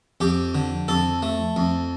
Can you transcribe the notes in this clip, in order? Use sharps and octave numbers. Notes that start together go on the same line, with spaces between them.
F2 G4
D3
F2 A4
A3
F2